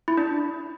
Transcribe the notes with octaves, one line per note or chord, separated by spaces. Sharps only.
E4
D4